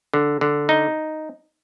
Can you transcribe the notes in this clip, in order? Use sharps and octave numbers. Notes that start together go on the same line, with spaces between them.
D3
D3
D#4